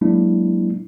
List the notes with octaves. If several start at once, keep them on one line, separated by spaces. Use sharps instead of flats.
F#3 G#3 A#3 D4 E4